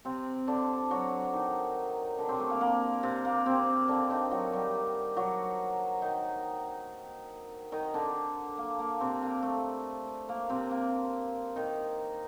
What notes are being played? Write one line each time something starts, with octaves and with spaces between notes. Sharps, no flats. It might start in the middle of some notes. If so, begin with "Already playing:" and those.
C3 C4
D3 D4
F#3 F#4
D#3 D#4
D3 D4
C3 C4
A3
A#3
A#3
C3 C4
A#3
C3 C4
D3 D4
D#3 D#4
F#3 F#4
G3 G4
F#3 F#4
D#3 D#4
D#3 D#4
D3 D4
A#3
A#3
C3 C4
A#3
A3
A#3
C3 C4
A#3
D#3 D#4